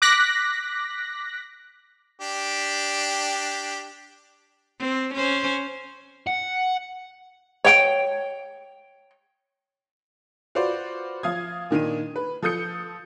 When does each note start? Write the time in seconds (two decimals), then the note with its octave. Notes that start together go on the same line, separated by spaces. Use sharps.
0.02 D6 F#6 A#6 B6
2.21 D4 G4
4.80 C4
5.14 C#4 C5
6.27 F#5
7.64 C#5 G5
10.55 F4 F#4 B4 C5 D5
11.23 F3 F5 D#6 G#6
11.70 A#2 D#3 D4 D#7
12.16 B4
12.42 F3 A4 D#6 G6 C#7